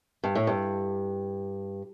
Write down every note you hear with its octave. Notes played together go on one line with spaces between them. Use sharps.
G2
A2
G2